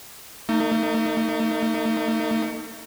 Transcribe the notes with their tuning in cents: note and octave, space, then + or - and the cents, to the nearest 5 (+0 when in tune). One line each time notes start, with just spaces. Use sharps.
A3 +45 D#4 +0